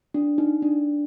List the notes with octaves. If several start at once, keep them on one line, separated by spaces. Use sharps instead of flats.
D4
D#4
D4